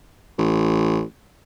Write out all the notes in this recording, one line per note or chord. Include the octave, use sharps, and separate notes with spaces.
A1